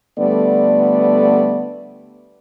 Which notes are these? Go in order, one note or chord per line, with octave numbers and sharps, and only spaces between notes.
D3 G3 A3 B3 D5